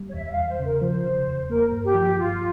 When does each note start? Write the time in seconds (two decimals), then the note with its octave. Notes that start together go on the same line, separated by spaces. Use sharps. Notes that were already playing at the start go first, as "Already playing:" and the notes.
Already playing: G3
0.09 C#5
0.14 E2 E5
0.25 E5
0.31 F5
0.37 E2
0.48 C5
0.59 C#3
0.65 A#4
0.82 F3 C5
1.05 C#3
1.27 E2
1.49 A#3 A#4
1.72 G2
1.84 G4
1.95 F3
2.01 G4
2.18 G2 F4